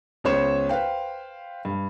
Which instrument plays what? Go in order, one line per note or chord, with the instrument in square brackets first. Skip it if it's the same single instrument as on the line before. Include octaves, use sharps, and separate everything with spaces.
[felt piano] C#2 B3 C5 C#5 C#6 E7
B4 C5 F5 G5
G2